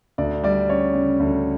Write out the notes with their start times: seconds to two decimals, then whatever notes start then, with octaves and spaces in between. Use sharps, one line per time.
0.18 D2 D5
0.44 G3 D5
0.69 C#4 C#5
0.94 C#3
1.20 D2